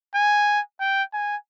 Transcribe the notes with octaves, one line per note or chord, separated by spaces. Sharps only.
G#5
G5
G#5